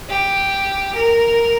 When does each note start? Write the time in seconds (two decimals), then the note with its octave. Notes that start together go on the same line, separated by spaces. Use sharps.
0.09 G4
0.95 A#4